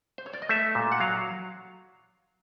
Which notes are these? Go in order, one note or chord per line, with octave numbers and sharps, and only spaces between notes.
C5
C#5
D5
D#5
A3 E5
A#2
F#5
F#3 F5